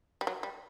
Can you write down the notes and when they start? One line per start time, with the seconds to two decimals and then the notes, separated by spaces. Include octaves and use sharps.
0.21 G3
0.27 F#3
0.43 G3